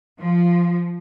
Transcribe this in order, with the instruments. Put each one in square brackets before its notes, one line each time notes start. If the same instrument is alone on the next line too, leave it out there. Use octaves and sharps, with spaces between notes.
[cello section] F3